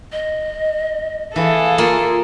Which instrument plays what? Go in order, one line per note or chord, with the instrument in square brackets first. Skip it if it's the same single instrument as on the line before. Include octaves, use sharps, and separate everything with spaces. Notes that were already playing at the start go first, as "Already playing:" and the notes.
[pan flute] D#5
[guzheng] E3 [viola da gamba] G#4 A4 [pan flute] F5
[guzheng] A#3 [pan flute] F4